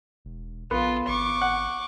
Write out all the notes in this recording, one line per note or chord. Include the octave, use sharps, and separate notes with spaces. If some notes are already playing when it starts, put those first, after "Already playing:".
E1
A#1 B3 F4 A4
G#1 C#6 D6
F#5